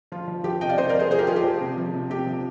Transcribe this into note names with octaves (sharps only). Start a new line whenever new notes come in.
F3 F4
F3
F3 G4
C3 D#5 G5
D5 F5
C3 C5 D#5
A#4 D5
F3
G#4 C5
F3 G#4 C5
G4 A#4
F3 F4 G#4
G4
F3
C3
F3
C3
C3 G4
F3